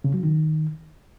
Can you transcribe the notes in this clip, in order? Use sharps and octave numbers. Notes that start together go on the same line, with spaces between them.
C#3
F#3
D#3